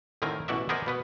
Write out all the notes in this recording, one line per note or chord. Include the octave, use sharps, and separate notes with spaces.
A2 D3 D#3 C4 A#4 G#5
A1 B2 E3 F#4 D5 E5
B3 G#4 A#4 C5 D5 D#5
B2 B3 B4